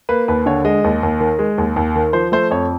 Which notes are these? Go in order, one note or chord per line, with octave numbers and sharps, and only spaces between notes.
A#3 B4
D#2 B4
D3 C#5
G#3 D#5
D#2
D#2
D#3
G#3
D#2
D#2
D#3
F3 C5
A3 C5
F2 C#5